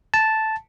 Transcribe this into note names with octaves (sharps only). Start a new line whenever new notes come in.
A5